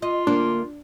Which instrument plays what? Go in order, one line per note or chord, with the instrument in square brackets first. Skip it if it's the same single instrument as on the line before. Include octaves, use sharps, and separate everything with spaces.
[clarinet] F4 [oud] D#5
[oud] D2 A#3 C5 [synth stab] D4